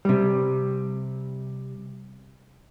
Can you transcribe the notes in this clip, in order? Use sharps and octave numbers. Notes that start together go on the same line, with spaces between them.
C3 G3